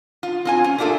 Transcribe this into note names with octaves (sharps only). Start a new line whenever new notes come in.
F4
C4 F4 G#5
C#4
A3 D4 F4 G4 A4